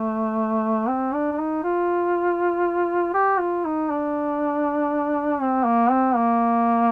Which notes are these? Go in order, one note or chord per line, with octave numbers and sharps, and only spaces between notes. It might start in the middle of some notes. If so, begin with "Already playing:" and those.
Already playing: A3
C4
D4
D4
D#4
F4
G4
F4
D#4
D4
C4
A#3
C4
A#3